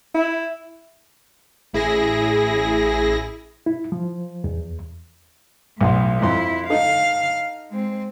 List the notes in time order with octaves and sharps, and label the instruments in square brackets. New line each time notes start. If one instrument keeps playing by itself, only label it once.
[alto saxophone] E4
[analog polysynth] A1 E4 G#4 A#6
[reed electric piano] E4
F3
E2
[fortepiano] B1 F#5 C6 [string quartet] A2
[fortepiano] F2 C6 [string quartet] E4
[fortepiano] D#4 A4 [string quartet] F5 F6
[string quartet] G#3 C4